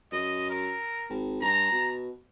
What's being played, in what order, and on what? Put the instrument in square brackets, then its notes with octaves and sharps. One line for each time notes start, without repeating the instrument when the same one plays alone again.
[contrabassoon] F#2 [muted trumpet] D#5
[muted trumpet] A#4
[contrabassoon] G#1
[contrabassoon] G2 [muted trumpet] A#5
[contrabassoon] B2